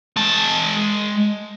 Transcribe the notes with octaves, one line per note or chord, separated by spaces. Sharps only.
G#3 A5